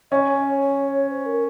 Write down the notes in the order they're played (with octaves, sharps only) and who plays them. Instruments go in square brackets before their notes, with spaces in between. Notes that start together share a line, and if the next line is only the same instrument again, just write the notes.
[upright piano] C#4 [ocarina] C#5 D#5
[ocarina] C#5
C5
A#4